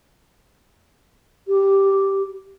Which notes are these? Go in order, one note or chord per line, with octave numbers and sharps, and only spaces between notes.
G4